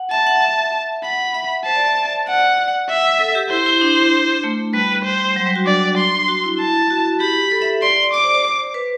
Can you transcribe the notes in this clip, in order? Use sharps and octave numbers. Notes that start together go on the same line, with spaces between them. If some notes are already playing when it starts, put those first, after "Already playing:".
Already playing: F#5
E5 A5
F#5
E5
F#5 B5
E5
C5 A5
D5
E5
D5
D5 F#5
E5 F#5
A4
G4
E4 C5
E4
D4
A3
G3 B4
C5
F#3
G3
F#4
D4 D5
C6
F#4
E4
A5
F#4
G4 B5
A4
E5
D5 C6
D5
D5 D6
C5
C5
C5
B4